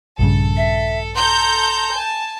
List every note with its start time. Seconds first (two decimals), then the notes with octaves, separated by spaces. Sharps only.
0.19 A#1 G2 C#3 A4
0.57 E5
1.15 A4 A#5 C6 G6
1.95 G#5 A5